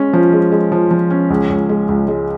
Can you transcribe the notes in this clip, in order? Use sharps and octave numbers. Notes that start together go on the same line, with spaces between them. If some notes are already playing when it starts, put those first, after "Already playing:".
Already playing: G#3 C#4
F3
G#3
G#3
F3
F3
C#4
C#2
C#2
G#3
C#2
G#3